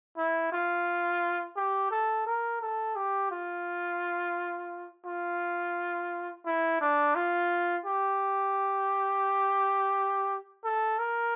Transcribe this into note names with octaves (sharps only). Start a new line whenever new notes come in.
E4
F4
G4
A4
A#4
A4
G4
F4
F4
E4
D4
F4
G4
A4
A#4